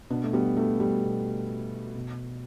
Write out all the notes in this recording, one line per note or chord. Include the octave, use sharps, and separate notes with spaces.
B2 B3 D4
A3
G3 B3
A3
G3
B2
B2